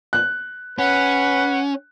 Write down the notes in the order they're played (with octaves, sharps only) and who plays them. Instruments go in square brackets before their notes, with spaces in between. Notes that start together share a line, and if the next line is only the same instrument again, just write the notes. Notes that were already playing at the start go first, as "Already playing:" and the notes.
[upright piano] F#6
[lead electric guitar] C#4 [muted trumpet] B4 [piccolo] F#5